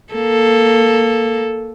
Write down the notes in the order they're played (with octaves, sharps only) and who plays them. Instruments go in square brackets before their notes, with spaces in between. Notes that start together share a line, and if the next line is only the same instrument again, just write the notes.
[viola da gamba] A#3 A4